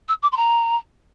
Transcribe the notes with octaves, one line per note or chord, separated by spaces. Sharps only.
E6
D6
C6
A#5